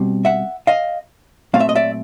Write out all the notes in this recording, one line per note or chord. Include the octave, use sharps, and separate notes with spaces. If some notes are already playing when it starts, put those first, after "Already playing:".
Already playing: B2 G3 C4
E5 F#5
D#5 F5
A#2 F#3 A3 C4 F5
E5
D#5
D5 E5